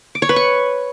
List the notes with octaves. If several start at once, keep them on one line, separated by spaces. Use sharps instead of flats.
D6
C#5
B4
C#6